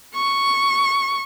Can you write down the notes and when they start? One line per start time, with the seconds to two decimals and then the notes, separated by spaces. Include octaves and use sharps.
0.15 C#6